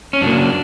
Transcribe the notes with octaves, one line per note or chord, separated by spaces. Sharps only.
C#4
F#2 C#3 F#3 A#3 D4